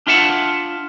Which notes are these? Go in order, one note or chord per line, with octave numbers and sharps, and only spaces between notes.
D4 F4 E5 F#5 A5